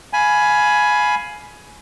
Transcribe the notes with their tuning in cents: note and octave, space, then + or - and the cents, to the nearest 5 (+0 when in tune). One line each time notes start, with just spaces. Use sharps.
F5 +0 G#5 +15 B5 +0